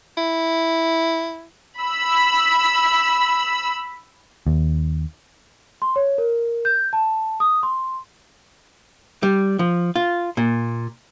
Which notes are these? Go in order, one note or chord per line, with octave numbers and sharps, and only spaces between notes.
E4
B5 E6
D#2
C6
C#5
A#4
G6
A5
D#6
C6
G3
F3
F4
A#2